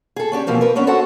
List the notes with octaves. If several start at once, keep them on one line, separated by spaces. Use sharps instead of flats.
G#4 A4
C#4 D4 G4 D5
B2 E3 F3 A#3 C4
A#4 B4
B3 C#4 D4 C#5 D#5
F#4 A4 C5 D#5 F#5